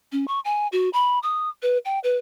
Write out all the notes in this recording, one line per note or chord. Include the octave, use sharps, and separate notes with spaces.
C#4
C#6
G#5
F#4
B5
D#6
B4
G5
B4